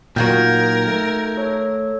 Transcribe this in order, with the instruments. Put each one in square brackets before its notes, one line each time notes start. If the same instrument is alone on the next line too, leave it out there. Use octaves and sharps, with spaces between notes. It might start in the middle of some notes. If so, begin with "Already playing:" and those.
[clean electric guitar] A#2 F#3 [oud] D#3 F4 F#4 [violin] A#4 [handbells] G6 G#6
[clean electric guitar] A3
[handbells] A4 C#5